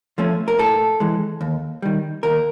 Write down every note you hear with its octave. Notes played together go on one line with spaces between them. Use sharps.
F3 A3 C#4
A#4
A2 A4
E3 G#3
D#2
D#3 G3
D#2 A#4